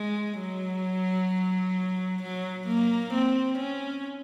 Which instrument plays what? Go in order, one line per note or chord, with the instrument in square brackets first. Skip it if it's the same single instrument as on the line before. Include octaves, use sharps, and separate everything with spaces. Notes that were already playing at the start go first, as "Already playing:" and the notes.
Already playing: [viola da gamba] G#3
F#3
F#3
A#3
C4
C#4